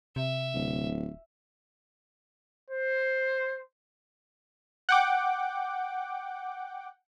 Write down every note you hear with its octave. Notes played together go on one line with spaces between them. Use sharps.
C3 E5
D1
C5
F#5 G5 D6